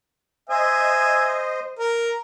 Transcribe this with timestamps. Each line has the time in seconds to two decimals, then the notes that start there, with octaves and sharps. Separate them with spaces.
0.50 C5 D#5 E5 G#5
1.79 A#4